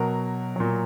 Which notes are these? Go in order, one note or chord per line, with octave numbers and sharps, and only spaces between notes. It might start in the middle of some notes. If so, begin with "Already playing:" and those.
Already playing: B2 F#3 A#4
A#2 F#3